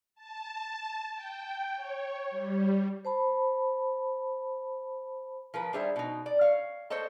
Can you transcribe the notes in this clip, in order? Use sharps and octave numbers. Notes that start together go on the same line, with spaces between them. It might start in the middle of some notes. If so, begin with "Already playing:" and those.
A5
G5
C#5
G3
C5 A5 B5
F3 A#4 B4
G3 D4 G#4 C5 E5
B2 D#4
D5
C#5 F5
A4 C5 C#5 D#5 A5